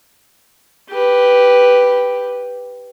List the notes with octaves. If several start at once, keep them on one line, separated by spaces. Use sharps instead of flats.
G4 B4